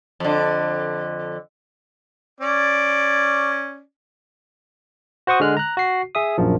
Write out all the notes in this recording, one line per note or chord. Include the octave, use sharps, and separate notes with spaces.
F2 D3
C#4 D5
F#4 C5 F#5 C#6 D#6
D3 G#3 F6 F#6
A#5 F#6
F#4 C7
G#4 E5 D#6
A#1 F#2 F3